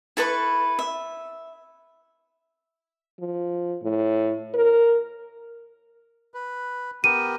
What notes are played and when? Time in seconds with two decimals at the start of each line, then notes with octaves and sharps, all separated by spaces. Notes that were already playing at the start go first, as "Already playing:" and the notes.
0.17 E4 A4 B4 C#6
0.79 E5
3.19 F3
3.83 A2
4.54 A#4
6.34 B4
7.04 B3 G4 A#4 D#7